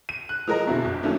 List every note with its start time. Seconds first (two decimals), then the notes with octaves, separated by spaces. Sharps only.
0.09 D#7
0.29 F#6
0.47 F3 G#3 A#4 D#5 A#5
0.67 E2 B2 D3 E4 F#4
0.85 G1
1.03 D#3 F#3 A3 A#3 C#4 D4